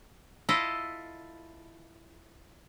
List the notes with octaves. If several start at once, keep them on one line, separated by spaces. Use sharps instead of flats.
E4 F4 A4 D#5